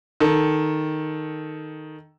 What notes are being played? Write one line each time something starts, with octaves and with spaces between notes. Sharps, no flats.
D#3 A4